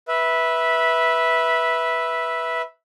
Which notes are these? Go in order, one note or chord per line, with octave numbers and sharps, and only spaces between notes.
B4 E5